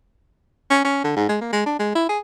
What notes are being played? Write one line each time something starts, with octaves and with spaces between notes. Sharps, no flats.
C#4
C#4
D3
G#2
G#3
A#3
G#3
D4
G#3
E4
G#4